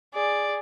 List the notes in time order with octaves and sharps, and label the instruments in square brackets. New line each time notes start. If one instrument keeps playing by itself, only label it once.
[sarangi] G#4 [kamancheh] D5